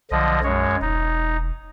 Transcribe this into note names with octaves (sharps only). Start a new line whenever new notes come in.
B1 D3 F3 D#5
F#2 G#3 C#5
E1 D#4